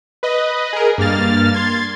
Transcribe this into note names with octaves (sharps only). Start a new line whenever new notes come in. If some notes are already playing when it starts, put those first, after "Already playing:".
B4 D#5
G#4 A#4
G2 A#3 F6 A6
C6 G#6 A6